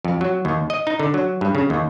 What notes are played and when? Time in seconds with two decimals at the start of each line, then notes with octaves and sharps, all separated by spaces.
0.05 F2
0.21 F#3
0.45 D#2
0.70 D#5
0.87 D#4
1.00 D3
1.14 F#3
1.41 G2
1.55 C#3
1.70 D#2